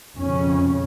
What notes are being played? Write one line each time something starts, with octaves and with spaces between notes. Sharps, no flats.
F2 C#3 C#4